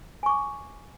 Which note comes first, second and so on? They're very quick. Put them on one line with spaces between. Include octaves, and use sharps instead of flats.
G#5 C#6 D6